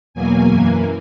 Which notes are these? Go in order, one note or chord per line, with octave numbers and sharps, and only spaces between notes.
E2 B2 F#3 A#3 G#5
F#2 E3 A#3